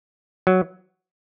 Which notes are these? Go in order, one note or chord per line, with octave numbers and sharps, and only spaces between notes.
F#3